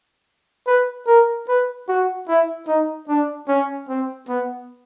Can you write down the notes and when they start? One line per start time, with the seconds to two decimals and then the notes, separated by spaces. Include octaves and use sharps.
0.67 B4
1.07 A#4
1.48 B4
1.88 F#4
2.28 E4
2.67 D#4
3.08 D4
3.48 C#4
3.89 C4
4.28 B3